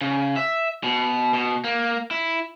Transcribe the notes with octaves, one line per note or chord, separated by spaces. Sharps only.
C#3
E5
B2
B2
A#3
E4